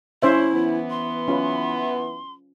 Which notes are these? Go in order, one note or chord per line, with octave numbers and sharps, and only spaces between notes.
C#4 E4 C5 E5
E3 B3
C6
C#4 F4 B4